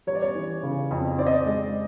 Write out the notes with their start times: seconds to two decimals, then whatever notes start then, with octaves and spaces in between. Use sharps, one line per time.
0.07 G3 C#5
0.15 D5
0.22 C#5
0.35 E3
0.63 C#3
0.91 F2
1.18 C4 D5
1.27 D#5
1.34 D5
1.46 G#3